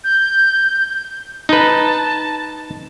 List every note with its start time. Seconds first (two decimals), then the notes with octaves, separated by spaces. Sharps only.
0.04 G6
1.49 D#4 B4 A5